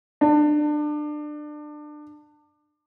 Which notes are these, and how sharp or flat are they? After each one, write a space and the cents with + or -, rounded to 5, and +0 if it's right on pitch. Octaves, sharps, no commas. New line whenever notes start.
D4 +25